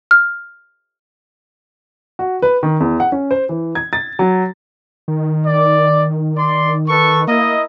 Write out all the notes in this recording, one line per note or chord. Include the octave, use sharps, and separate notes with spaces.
F6
F#4
B4
D#3
E2
F#5
C#4
C5
E3
G#6
A6
F#3
D#3
D5
D5 C6
A4 B4 C#6
A#3 E4 A#4 D#5